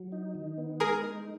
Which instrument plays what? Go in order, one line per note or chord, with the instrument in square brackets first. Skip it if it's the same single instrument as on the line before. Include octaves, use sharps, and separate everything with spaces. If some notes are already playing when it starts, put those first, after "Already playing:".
Already playing: [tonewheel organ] F#3
D#4
D#3
B3
[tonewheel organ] G#3 [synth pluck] G#4 A#4
[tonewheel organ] D#4